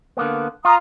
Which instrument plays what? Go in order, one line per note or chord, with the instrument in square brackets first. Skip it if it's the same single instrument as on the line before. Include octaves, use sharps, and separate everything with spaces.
[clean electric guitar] D3 A#3 B3
[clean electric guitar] F4 [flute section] A#5 D#6